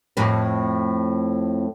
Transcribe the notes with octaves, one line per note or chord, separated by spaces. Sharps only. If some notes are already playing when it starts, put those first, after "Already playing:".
F2 A2 B4